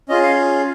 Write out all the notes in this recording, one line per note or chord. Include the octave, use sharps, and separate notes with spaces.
C#4 F4 G#4 D#5
F5